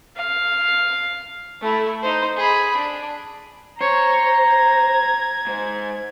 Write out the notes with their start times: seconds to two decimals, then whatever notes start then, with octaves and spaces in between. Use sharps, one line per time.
0.17 F5
1.61 A3 E4
2.03 D#4 C5
2.36 G#4 B5
2.76 D4
3.81 C5 C#5 A#5
4.46 G#6
5.47 G#2 C5